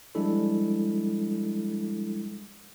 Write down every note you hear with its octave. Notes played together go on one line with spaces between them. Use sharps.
F3 G3 G#3 D4 E4 A4